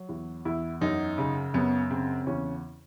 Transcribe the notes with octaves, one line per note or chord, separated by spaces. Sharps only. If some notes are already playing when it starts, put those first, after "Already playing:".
Already playing: F#3
E2
E2 E4
F#2 D#4
C#3
F#2 B3
C#3 C4
C4
E2 C#4